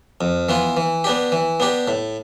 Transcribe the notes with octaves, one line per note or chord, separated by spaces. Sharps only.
F2
E3 B3 F4
E3
B3 D4 G4
E3
B3 D4 G4
A2